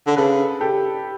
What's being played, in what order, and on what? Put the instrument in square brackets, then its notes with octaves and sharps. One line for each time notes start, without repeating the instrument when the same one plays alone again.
[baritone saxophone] D3
[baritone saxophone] C#3 [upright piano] A4 B4
[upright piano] G4 A4